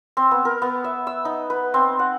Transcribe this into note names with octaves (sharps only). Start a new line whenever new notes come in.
C4
B3
A#4
B3
E5
E6
D#4
B4
C4
F#5